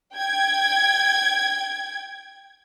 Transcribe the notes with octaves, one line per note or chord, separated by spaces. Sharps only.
G5 G#6